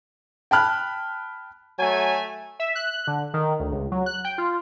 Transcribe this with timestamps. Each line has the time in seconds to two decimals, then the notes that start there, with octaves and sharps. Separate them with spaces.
0.51 G5 A5 B5 F6 F#6
1.79 F#3 A3 G#5
2.59 E5
2.75 F#6
3.07 D3
3.34 D#3
3.60 D2
3.72 C#2
3.92 F#3
4.06 F#6
4.25 G5
4.38 F4